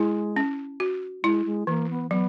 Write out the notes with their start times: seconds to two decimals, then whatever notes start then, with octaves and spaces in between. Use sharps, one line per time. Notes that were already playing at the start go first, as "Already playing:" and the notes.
Already playing: G#3 E4
0.36 C#4
0.80 F#4
1.24 G#3 E4
1.46 G#3
1.67 E3 A#3
1.90 B3
2.11 F#3 B3